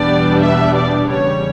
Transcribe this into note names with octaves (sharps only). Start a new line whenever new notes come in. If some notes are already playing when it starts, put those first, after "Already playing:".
Already playing: E2 B2 G3 B3 D4 D5
E5
D5
E2 C#3 G3 C#5